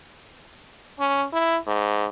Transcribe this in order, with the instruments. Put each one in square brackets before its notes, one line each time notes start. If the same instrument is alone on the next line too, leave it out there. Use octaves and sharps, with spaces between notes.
[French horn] C#4
E4
G#2